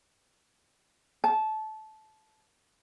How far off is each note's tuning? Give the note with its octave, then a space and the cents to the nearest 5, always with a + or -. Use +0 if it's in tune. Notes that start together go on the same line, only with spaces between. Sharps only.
A5 -20